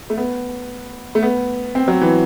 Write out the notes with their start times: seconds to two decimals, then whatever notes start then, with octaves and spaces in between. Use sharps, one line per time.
0.10 A3
0.17 B3
1.15 A3
1.23 B3
1.75 C4
1.88 F#3
2.01 E3